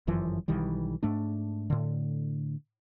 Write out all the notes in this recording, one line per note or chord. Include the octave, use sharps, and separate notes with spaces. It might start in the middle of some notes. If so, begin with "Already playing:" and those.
G1 F#2 E3 F3
B1 D#3 E3 G3
G#2 A3 D4
A2 D3